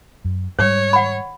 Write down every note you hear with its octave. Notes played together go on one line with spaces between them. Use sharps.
F#2
G#2 G3 C5 C#5
F#5 B5